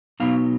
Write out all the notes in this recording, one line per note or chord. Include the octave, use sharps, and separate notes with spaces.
B2 F#3 B3 D#4 F5